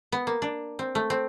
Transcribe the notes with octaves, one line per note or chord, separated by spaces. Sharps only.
B3
A#3
D4
C4
A3
C4